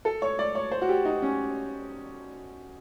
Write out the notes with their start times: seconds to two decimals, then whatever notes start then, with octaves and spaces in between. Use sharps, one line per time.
0.05 A4
0.22 C#5
0.39 D5
0.55 C#5
0.71 C5
0.82 F#4
0.89 G4
1.05 D#4
1.22 C#4